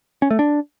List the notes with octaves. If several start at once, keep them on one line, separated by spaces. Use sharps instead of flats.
C#4
A3
D4